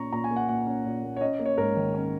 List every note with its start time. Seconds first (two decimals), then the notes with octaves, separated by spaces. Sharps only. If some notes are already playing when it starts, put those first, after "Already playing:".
Already playing: A#2 C#4 A#5 C#6
0.12 A#2 A#5
0.24 G#5
0.31 A#3
0.36 F#5
0.49 A#2 F#5
0.67 C#4
0.85 A#2
1.03 A#3
1.17 C#5
1.21 C#4 D#5
1.39 A#3
1.46 C#5
1.58 G#2 A#4
1.76 D#3
1.94 C#4